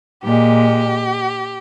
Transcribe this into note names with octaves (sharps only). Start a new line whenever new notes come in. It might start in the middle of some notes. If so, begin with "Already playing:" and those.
A#2 G#3 G4